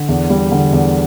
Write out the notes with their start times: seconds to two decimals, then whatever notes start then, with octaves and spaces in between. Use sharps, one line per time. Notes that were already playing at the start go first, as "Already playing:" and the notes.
Already playing: D3
0.09 E2
0.30 G3
0.52 D3
0.73 E2